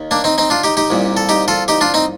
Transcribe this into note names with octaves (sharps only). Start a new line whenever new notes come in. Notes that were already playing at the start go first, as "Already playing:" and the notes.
Already playing: D#2 D#3
A#3 D4
C4 D#4
C4 D#4
D4 F4
D#4 G4
D#4 G4
C2 A#2
A4
D#4 G4
F4 A4
D#4 G4
D4 F4
C4 D#4